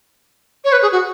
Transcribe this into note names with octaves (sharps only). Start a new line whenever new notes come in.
C#5
B4
G#4
F#4